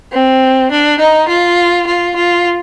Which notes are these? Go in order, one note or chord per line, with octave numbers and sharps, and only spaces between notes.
C4
D4
D#4
F4
F4
F4